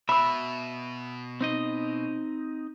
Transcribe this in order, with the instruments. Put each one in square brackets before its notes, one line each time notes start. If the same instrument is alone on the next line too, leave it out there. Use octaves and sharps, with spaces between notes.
[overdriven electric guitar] B2 [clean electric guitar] E5 [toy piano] B5 E6
[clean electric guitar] C4 D#4 D#5